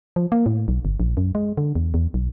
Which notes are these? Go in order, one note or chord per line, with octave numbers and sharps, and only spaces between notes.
F3
A#3
A2
B1
G1
A#1
F#2
G#3
D3
E2
E2
B1